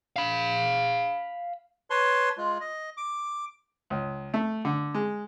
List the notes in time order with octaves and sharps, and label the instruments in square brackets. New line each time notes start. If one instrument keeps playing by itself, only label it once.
[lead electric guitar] F5 B5
[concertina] B4 C#5 A5 C6
G#3 F4
D#5
D6
[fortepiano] C#2
A3
D3
G#3